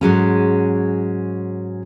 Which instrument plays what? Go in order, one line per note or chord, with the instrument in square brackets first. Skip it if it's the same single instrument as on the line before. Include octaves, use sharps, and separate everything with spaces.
[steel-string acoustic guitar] G#2 F#3 G#3 C#4